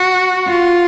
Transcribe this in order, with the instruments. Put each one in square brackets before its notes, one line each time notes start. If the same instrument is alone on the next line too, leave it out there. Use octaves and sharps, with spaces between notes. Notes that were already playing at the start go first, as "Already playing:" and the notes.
Already playing: [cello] F#4
F4